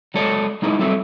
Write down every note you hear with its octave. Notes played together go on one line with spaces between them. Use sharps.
F#3 G#3 A4 C#5 D5
G#3 D#4 E4 G#4 A#4 B4
F#3 G3 C4 A4 E5